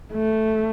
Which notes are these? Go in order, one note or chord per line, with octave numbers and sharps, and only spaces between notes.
A3